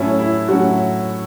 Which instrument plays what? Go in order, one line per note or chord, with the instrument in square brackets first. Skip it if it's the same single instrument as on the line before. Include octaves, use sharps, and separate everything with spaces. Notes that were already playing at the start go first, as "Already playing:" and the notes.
Already playing: [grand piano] A2 F#3 C#4 [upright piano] E4
[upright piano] E4
[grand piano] A2 F#3 C#4 [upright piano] F#4